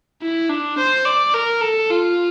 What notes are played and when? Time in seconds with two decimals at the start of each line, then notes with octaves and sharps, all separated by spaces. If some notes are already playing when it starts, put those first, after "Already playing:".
0.22 E4
0.50 D4
0.78 C5
1.05 D5
1.34 A#4
1.62 A4
1.90 F4